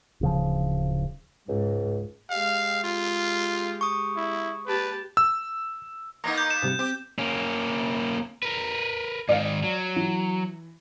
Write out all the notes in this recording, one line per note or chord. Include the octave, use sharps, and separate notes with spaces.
D1 C#3 F3
C#2 G#2
G#3 G4 F5
F4
C#6 D#6
E4
G4 B4 A5
E6
A#3 B3 D#4 D#5 A#5 C#6
G6
E7
G#2 C3 G3
C4 G4
A#3 C#4
A#4 B4
G#2 D#3 D5 F5
F#3
E3